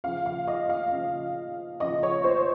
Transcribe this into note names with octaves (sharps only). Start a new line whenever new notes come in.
C#3 F3 F5
F5
D#5
F5
C#3 F3
C#3 F3 D#5
C#5
C5